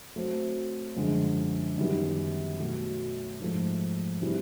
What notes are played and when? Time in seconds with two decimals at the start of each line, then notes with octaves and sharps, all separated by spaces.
0.16 F#3 A3 C4
0.96 F#2 D3 F3 G#3
1.78 F#2 D#3 G3 B3
2.59 B2 F#3 A3
3.39 G#2 F3 A3
4.21 C3 E3 G3